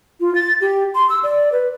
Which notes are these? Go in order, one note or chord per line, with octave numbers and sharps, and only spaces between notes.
F4
A6
G4
C6
E6
D5
B4